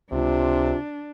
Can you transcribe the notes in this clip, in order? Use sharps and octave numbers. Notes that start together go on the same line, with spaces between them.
C#2 C3 D4 F4